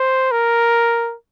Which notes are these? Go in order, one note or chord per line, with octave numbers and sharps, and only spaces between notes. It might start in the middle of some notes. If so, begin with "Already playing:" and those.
Already playing: C5
A#4